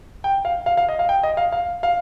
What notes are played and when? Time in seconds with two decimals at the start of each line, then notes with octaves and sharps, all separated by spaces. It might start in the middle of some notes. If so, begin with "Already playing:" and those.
0.24 G5
0.45 F5
0.66 F5
0.77 F5
0.89 D#5
0.99 F5
1.09 G5
1.23 D#5
1.37 F5
1.52 F5
1.83 F5